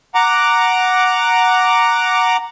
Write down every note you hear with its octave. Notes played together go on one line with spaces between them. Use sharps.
F#5 A#5 D6